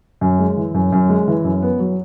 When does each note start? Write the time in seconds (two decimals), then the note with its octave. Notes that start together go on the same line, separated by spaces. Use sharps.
0.21 F#2
0.39 G#3
0.57 E3
0.74 F#2
0.92 F#2
1.09 G#3
1.27 E3
1.44 F#2
1.62 B3
1.79 F#3